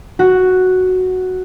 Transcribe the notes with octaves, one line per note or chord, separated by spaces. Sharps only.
F#4